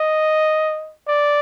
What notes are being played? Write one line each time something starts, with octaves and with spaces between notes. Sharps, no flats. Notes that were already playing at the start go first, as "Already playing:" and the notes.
Already playing: D#5
D5